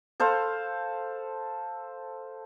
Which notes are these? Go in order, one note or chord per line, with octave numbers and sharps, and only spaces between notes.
A4 C5 F5